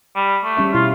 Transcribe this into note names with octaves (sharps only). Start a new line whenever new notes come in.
G3
A3
G3 C#4 E5
B2 E4 F4 F5